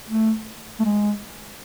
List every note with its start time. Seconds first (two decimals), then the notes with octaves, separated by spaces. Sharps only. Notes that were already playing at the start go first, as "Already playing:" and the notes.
0.09 A3
0.79 A3
0.84 G#3